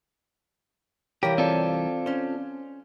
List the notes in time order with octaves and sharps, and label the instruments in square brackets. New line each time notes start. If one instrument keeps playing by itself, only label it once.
[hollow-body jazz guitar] C2 E3 A#4 [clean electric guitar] G4 [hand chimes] C#5 F5
[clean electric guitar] C4 F4 A4 [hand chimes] D5
[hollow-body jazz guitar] C#4 C5